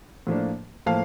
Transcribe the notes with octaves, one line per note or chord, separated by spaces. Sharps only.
A2 F3 A#3 D4
A2 F3 A#3 F5 A5